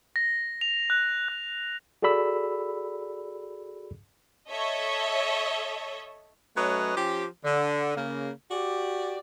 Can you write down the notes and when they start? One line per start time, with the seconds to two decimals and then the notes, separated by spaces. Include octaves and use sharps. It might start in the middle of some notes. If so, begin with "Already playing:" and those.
0.16 A#6
0.61 F7
0.90 F#6
1.28 F#6
2.02 F#4 G#4 A4 D5 B5 E6
4.50 A4 C#5 D#5 E5
6.56 F#3 A3 C#4 B4 D#5
6.96 F3 C#4 G4
7.44 D3
7.96 C#3 A#3
8.51 F#4 G4 D5